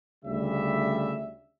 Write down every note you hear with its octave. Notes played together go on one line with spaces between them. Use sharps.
D2 C#3 G3 E5